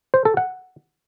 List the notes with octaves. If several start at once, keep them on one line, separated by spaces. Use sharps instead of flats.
C5
A4
F#5